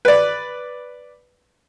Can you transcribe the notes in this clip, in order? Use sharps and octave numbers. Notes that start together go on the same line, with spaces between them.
B4 D5